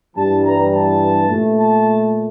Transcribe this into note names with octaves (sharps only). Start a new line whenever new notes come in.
G2 E3 G3 A5
A#5
A5
A#2 A3
A5